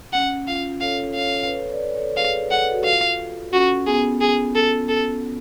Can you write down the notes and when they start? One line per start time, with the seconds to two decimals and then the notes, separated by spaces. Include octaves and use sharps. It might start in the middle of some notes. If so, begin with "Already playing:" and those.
0.13 C#4 F#5
0.48 F4 F5
0.81 A4 C#5 F5
1.15 A4 C#5 F5
1.45 B4
1.49 A4 C#5
1.72 B4 D5
1.94 A4 C#5
2.17 G#4 B4 F5
2.51 A4 F#5
2.62 B4
2.71 F#4 A4
2.85 F4 F5
3.53 C#4 F#4
3.87 B3 G#4
4.21 G#4
4.55 A4
4.89 A4